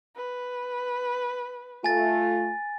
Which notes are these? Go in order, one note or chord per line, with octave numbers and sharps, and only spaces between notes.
B4
A3 F4 G#5 A6